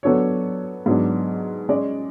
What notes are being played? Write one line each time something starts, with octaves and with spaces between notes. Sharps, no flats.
F#3 B3 D4 A4 C#5
G#2 F#3 B3 D4
G#3 C#4 G#4 D5